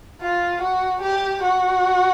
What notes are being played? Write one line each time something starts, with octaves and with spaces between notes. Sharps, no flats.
F4
F#4
G4
F#4